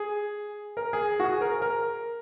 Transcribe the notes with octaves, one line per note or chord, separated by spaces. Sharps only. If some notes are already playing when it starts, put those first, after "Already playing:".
Already playing: G#4
A#4
G#4
F#4
G#4
A#4
A#4